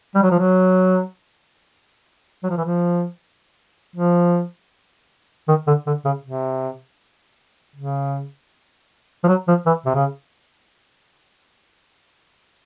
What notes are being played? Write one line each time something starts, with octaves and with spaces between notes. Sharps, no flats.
G3
F#3
F3
F#3
F#3
F3
E3
F3
F3
D#3
D3
D3
C#3
C3
C#3
F3
F#3
F3
E3
C3
C#3